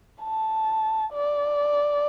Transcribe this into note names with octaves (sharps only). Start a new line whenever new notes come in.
A5
D5